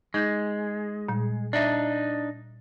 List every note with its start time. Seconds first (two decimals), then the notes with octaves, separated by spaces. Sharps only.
0.14 G#3 D#4 G6
1.09 A#2 G3
1.53 D4 D#4 D5 E5